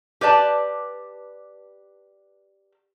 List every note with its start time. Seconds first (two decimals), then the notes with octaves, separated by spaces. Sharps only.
0.21 G4 B4 D5 A5